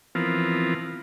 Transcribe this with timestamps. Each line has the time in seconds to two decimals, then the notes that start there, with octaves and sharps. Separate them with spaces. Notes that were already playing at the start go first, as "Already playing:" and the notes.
0.15 E3 F3 B3 C4 F4 A#4